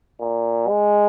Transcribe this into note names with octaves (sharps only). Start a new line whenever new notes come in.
A#2
G#3